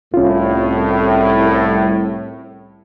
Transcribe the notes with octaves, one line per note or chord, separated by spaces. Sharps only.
C2 A2 C#4 F4